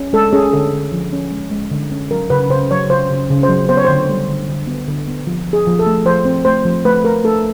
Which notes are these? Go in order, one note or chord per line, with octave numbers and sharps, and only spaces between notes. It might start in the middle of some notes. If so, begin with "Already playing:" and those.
Already playing: C#4
G#3 A4
C#4 G#4
D3 A4
D3
F3
C#4
G#3
G#3
D3
C#4
F#3 A#4
C#3 B4
C#3 C5
F#3 C#5
C#3 C5
C#3
C#3
C5
F#3
B3 C5
C#5
D3 C5
G3
D3
D3
B3
D3
B3
F3
F3
G#4
F3
A4
A3
F3 C5
C4
A3 C5
F3
A3 B4
A3 A#4
A3 A4